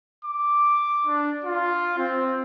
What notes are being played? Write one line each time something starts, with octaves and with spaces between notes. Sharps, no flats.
D6
D4
F4
C4